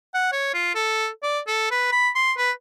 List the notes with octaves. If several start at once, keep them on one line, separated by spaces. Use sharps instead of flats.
F#5
C#5
F4
A4
D5
A4
B4
B5
C6
B4